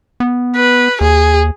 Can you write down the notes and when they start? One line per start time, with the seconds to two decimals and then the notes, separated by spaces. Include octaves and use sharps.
0.20 B3
0.56 B4
1.01 D#2 G#4